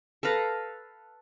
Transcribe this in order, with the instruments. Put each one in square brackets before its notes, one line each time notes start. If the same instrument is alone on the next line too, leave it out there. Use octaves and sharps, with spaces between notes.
[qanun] A4 B4 F5 A#5